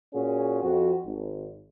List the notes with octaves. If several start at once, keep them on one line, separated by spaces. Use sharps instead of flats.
A#2 C#4 F#4 G#4
F2 F#4
G#1